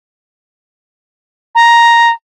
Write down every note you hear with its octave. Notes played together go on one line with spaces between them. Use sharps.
A#5